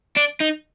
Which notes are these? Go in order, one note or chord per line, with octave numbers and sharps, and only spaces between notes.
D4
D#4